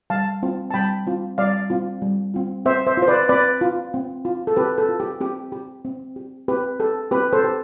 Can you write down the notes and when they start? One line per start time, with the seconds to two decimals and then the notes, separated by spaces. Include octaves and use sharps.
0.10 G3 F5 A5
0.43 C4 F4
0.71 A5
0.74 G3 G5 B5
1.07 C4 F4
1.38 G3 D5 F5
1.70 C4 F4
2.02 G3
2.34 C4 F4
2.66 C4 C5 E5
2.87 C5 E5
2.97 F4
3.02 C5
3.08 B4 D5
3.29 C4 B4 D5
3.61 F4
3.94 C4
4.25 F4
4.47 A4
4.56 C4 G4 B4
4.78 A4
4.89 F4
5.00 G4
5.20 C4 G4
5.52 G4
5.85 C4
6.16 G4
6.48 C4 G4 B4
6.80 G4 A4
7.11 C4 G4 B4
7.33 A4 C5
7.44 G4